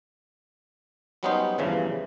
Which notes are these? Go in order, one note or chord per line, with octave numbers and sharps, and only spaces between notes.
F#3 G3 B3 C#4 D#4 C5
E2 G2 C#3 E3 F3